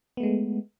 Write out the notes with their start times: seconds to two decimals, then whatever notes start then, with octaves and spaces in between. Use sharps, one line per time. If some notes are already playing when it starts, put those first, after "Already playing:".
0.17 B3
0.20 A3
0.23 G#3